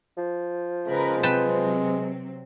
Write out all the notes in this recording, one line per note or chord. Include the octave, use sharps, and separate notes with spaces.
F3
C#3 G#3 A#4 B4
C3 F#3 C4 B4 G5 A5